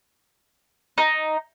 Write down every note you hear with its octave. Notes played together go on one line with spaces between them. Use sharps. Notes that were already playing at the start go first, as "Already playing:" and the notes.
D#4